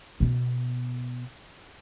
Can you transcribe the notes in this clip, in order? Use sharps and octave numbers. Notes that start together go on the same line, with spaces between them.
B2 B3